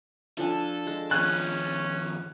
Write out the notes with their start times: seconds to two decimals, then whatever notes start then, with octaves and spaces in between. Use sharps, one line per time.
0.38 F3 D4 A4 G#5
0.86 G#3
1.11 D#2 F3 C#4 F#6